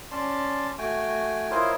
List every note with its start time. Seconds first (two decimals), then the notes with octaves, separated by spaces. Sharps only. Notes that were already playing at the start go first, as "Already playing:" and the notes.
0.12 C#4 D5 A5 C6
0.78 A3 F#4 G5 G#5
1.51 E4 F4 A#4 C5 C#5 D#5